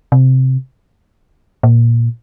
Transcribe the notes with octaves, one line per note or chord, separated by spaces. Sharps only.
C3
A#2